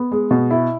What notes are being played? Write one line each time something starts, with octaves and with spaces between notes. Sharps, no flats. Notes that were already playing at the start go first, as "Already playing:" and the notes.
Already playing: B3
G#3
B2
E4